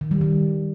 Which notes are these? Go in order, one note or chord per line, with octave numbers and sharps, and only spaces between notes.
D#3
G3
D#3